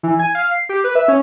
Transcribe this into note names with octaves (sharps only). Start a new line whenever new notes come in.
E3
G#5
F5
C7
G4
B4
E5
C#4